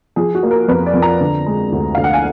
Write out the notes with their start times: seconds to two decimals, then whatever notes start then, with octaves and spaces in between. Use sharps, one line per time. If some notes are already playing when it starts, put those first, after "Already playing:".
0.16 F3 G#4
0.35 F#4
0.43 A#3
0.51 A#4
0.68 F2 B4
0.86 D5
0.94 F2
1.02 A#5
1.21 D3
1.46 G#3
1.72 D2
1.95 D2 F5
2.04 F#5
2.13 G#5